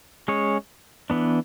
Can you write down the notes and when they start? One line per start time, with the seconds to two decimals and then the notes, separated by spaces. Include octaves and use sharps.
0.28 G#3 C#4 G#4 C#5
1.10 E3 B3 D4